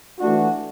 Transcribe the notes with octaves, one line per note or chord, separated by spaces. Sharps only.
E3 A3 D4 F#4